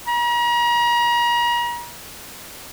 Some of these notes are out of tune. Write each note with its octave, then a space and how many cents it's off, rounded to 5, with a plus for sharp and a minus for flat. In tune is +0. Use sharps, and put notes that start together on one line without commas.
A#5 +40